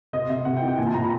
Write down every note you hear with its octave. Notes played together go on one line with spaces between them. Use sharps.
C3 D#5
C3 E5
C3 F#5
G5
E3
G5
A#2 G#5
A5
A#2 A#5
B5